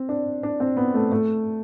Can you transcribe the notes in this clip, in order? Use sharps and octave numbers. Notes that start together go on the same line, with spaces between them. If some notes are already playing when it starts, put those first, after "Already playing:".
Already playing: C4
D4
D4
C4
B3
A3
A3